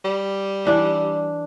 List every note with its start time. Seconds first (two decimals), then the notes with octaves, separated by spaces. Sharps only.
0.05 G3
0.65 E3 D4 E5